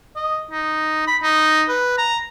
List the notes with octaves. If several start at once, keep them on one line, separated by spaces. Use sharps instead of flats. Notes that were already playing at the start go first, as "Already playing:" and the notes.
D#5
D#4
B5
D#4
B4
A#5